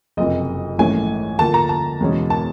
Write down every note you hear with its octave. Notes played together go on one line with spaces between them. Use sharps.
F#1 F2 C3 D#5
A#1 G#2 E3 A3 C#4 G#5
D#2 D3 F3 A5
A#5
A5
E2 B2 G#3 C#4
A5